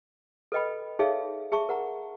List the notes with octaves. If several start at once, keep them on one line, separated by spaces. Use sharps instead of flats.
A4 B4 D#5 G5 B5
D#4 G#4 A4 C#5 E5 F5
G#4 E5 A5 C#6
A#4 F#5 A#5